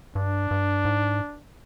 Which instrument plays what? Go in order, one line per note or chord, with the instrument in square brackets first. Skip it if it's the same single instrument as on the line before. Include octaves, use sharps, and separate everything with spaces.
[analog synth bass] G2 [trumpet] D4
[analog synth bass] G2
G#2